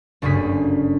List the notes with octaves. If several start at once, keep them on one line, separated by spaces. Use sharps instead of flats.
F#1 D2 G2 C#3 G#4 B6